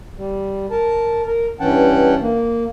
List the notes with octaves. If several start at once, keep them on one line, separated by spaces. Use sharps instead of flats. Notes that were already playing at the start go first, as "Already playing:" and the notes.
G3
A#4 A5
A#4
G2 E3 C#4 F#5 G5 A5
A#3